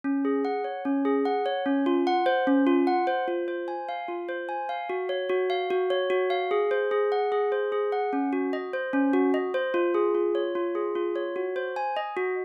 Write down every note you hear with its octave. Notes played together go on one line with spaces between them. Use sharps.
C#4
G#4
F#5
C#5
C#4
G#4
F#5
C#5
C#4
F4
F#5
C5
C#4
F4
F#5
C5
F4
C5
G#5
F5
F4
C5
G#5
F5
F#4
C#5
F#4
F5
F#4
C#5
F#4
F5
G#4
C5
G#4
F#5
G#4
C5
G#4
F#5
C#4
F#4
D#5
C5
C#4
F#4
D#5
C5
F4
G#4
F4
C#5
F4
G#4
F4
C#5
F#4
C5
G#5
D#5
F#4